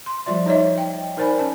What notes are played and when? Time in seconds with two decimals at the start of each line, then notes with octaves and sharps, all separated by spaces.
0.06 C6
0.26 F3 G3 F4 D5 E5
0.46 D#4 C#5 D#5 E5
0.78 G5
1.17 D#4 A#4 C5 D5 G#5 B5
1.39 C#4 A5